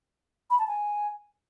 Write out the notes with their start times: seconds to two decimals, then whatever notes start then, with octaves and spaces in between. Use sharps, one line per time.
0.50 B5
0.59 A5
0.67 G#5